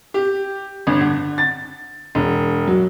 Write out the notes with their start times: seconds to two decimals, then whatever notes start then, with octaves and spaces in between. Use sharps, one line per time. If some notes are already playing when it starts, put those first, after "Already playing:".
0.14 G4
0.87 G1
1.01 D3
1.38 A6
2.15 E1
2.67 F#3